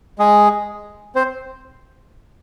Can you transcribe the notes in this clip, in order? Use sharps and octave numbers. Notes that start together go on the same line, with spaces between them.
G#3 G#4
C4 C5